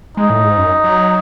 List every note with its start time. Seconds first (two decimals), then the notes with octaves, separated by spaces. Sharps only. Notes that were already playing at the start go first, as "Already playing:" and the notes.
0.17 G#3 D#4
0.30 A2
0.44 G#2
0.57 F#2
0.84 F#3